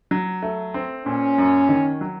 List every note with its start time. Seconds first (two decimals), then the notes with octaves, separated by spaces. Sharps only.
0.11 F#3
0.43 A3
0.74 C4
1.06 A#2 C#4
1.38 F#2
1.69 D#3
2.01 F#3